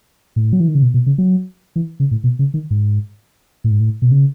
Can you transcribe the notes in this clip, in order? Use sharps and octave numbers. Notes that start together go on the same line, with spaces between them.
A2
F#3
E3
D#3
C#3
B2
B2
C#3
F#3
E3
C#3
A2
B2
C#3
D#3
G#2
A2
G#2
A2
B2
C#3